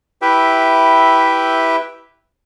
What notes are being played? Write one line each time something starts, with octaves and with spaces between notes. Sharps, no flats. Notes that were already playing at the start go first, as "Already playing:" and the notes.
E4 G4 B4 E5 G5